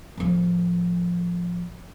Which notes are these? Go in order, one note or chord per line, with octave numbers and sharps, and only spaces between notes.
A2 F3